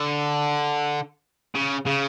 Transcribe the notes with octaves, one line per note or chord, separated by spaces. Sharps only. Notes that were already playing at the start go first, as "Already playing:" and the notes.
Already playing: D3
C#3
C#3